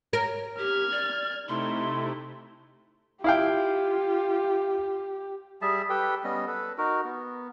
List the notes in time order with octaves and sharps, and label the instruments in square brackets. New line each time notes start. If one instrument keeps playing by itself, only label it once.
[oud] A#4 [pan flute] C#5
[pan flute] G4 [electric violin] F6 G#6
[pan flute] D5
[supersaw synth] C3 A3 E4 [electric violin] D#4 [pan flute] C6
[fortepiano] E4 F5 G5 [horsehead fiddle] F4 [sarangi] G4
[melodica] G3 G#4 E5 A5
G4 A4 B4 G5
G3 B3 C#4 D#5
A4 B4
D#4 F#4 A#4
B3